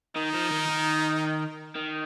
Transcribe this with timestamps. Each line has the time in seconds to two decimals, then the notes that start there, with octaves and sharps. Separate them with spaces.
0.16 D#3 D#4
0.34 F3
0.51 D#3
0.69 D#3
1.75 D#3